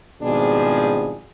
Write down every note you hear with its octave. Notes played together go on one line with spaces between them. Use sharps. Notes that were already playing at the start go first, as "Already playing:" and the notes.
G#1 B2 F3 G3 D4 G#4